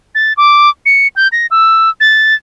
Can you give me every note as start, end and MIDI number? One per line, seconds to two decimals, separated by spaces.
0.15 0.33 93
0.37 0.70 86
0.86 1.08 97
1.16 1.28 91
1.32 1.47 94
1.51 1.90 88
2.00 2.35 93